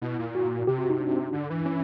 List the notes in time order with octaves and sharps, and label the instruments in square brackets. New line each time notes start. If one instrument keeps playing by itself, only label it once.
[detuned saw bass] B2 [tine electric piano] E4
[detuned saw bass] A#2
[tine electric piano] F#4
[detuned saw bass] C3 [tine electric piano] G4
[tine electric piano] F#4
D#4
D4
[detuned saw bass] D3
E3
[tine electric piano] C#4